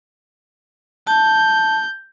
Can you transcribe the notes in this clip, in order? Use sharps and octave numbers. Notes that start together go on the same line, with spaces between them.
A5 G6